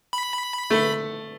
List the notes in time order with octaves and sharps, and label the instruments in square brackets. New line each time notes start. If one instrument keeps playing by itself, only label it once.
[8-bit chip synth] B5
[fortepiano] A3